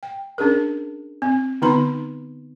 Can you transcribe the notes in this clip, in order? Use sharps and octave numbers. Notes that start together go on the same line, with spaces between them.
G5
C#4 D4 G#4 A#4
C4
D3 B3 D#4 A#5 C6